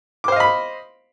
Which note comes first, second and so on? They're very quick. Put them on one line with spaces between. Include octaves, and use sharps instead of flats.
D6 C5 F5 D#5 B5